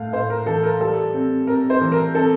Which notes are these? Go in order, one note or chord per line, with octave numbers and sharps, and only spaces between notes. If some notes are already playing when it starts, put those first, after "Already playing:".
Already playing: A2 A3 F5
A2 C5
A#4
E3 A4
A#4
G3 A4
C4
C4 A#4
C5
E3
A#4
C4 A4